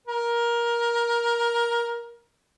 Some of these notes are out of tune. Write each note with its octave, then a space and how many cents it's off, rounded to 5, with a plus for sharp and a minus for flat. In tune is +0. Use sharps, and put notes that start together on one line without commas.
A#4 +15